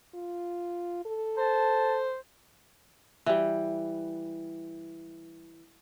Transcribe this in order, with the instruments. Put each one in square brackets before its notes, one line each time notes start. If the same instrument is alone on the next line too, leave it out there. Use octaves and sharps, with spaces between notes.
[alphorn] F4
A4
[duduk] C5 [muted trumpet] A5
[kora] E3 G3